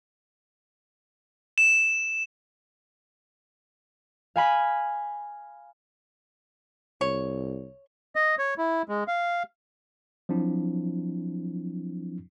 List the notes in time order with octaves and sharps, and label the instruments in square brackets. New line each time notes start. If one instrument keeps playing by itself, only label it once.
[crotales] E7
[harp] F5 G#5 B5
[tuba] C2 [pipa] C#5
[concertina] D#5
C#5
E4
G#3
F5
[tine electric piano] F3 F#3 C4 D4 E4